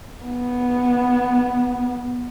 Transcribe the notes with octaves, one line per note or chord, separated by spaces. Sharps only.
B3